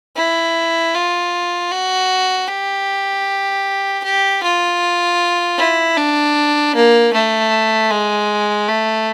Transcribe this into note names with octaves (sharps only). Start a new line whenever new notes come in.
E4
F4
F#4
G4
G4
F4
E4
D4
A#3
A3
G#3
A3